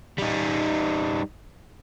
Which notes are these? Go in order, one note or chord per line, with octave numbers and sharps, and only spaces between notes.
G3 D#4